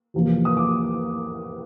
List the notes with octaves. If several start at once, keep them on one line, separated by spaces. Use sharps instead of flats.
E2 C3 F3 A#3
D#6
D6